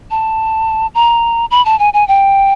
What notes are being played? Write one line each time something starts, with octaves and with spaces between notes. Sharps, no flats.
A5
A#5
B5
A5
G#5
G#5
G5